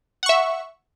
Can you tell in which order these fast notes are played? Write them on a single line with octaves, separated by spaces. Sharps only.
F#5 C#6 E5